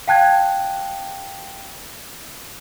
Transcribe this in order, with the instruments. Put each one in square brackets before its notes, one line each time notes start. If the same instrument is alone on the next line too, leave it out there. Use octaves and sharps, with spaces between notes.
[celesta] F5 G5 A5 F#6 G#6